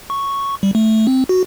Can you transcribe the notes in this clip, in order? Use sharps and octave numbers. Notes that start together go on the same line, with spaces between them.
C#6
G3
A3
C4
F#4